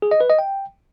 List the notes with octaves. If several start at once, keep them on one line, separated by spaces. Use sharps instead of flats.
G#4
D#5
B4
D#5
G5